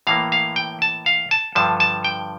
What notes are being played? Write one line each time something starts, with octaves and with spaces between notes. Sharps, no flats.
A2 E3 A#3 F5
F5
G5
A5
F5
A5
G2 D3 F3 A5
A5
G5